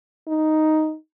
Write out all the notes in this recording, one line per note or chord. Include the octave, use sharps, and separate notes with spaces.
D#4